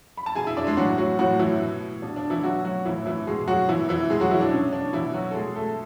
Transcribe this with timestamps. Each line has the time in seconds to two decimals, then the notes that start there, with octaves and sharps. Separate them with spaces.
0.17 B5
0.26 A5
0.35 B2 G#4 G#5
0.47 E4 E5
0.57 D4 D5
0.67 G#3 G#4
0.77 A2 E3 F#3 F#4
0.98 F#3 F#4
1.19 A2 E3 F#3 F#4
1.39 E3 E4
1.61 B2
2.02 B2 D4
2.16 D4
2.30 E3 E4
2.43 B2 F#3 F#4
2.65 F#3 F#4
2.85 A2 E3 E4
3.06 E3 E4
3.27 B2 G#3 G#4
3.47 F#3 F#4
3.68 B2 E3 E4
3.89 E3 E4
4.10 B2 G#3 G#4
4.20 F#3 F#4
4.31 E3 E4
4.41 D4
4.51 B2 C#4
4.73 D4
4.93 B2 E3 E4
5.14 F#3 F#4
5.31 A4
5.35 B2 G#3 G#4
5.56 A3 A4